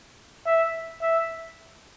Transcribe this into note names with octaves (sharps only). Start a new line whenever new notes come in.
E5
E5